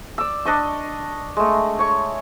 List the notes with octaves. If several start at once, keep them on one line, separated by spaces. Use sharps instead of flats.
D5 E6
D4 D#5 C#6
G#3 A3
C#5 C#6